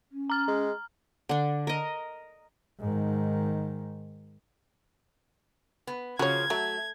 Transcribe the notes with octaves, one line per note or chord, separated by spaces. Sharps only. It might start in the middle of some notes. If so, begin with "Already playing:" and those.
C#4
A#5 F6
G#3
D3 D4
A#4 D#5
G#2 D#3
B3
C#3 F3 A#3 F#4 C#5 G#6
F#3 A3